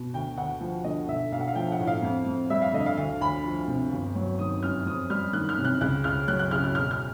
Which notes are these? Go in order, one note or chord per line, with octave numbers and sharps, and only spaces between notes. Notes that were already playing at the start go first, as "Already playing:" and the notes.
Already playing: B2
D2 G5
D2 F#5
F3
D3 D#5
B1 E5
B1 F5
F#5
F5
F3 G5
F#5
A2
F5
F2
F2
G3 E5
F5
D3 D#5
F5
D2 F5
D2 B5
F3
C3
G1
F#3
D#3 D#6
F#2 F6
F2 D#6
G3 F6
D#3 F#6
F6
C3
F#6
C#2 F#6
C#2 F6
F#3 F#6
F#6
C#3 F6
F6
E1 F6
F6